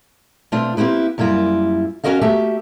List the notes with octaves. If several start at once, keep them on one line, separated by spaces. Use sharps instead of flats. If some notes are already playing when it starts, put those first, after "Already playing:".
B2 A3 C4 D4 F4
A#3 C4 E4 G4 B4
F#2 G3 A#3 E4 F4
C#4 D#4 F#4 A#4 D#5 F5
A3 A#3 F#4 G4 E5